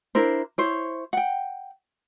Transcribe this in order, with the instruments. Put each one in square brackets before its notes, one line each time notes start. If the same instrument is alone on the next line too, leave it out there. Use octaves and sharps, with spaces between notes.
[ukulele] D4 E4 A#4 C5
E4 C5 C#5
F#5 G5